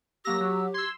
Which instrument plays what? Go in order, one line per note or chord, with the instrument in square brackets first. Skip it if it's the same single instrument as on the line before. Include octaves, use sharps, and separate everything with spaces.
[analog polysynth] F#3 A#3 A#6 [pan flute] G4 [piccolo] E6
[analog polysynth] F#3
[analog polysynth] C6 E6 [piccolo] G#6